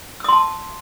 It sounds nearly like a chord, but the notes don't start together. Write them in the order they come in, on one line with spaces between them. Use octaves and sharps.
E6 D#6 C6 A5